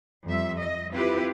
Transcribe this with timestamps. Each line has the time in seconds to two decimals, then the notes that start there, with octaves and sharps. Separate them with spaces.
0.24 F2 G3 E5
0.59 D#5
0.91 C4 E4 F4 G4 B4